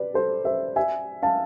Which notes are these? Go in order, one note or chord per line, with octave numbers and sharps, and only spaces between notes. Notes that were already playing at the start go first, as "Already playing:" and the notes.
Already playing: B4 D5
A4 C5
C5 E5
E5 G#5
F5 A5